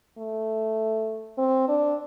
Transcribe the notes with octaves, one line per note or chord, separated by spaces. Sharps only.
A3
C4
D4